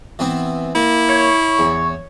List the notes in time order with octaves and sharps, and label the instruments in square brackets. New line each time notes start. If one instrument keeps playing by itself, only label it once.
[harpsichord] E3 B3 C4
[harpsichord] A#3 [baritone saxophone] E4
[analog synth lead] C#5
[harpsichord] E2